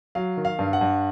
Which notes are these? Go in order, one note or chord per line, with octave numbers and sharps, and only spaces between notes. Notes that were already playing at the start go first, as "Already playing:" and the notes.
F#3 F5
D#3
F5
G2
F#5
G2